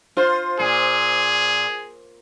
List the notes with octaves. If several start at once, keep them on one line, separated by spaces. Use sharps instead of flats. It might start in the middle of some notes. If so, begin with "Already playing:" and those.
F4 C5
A#2 G#4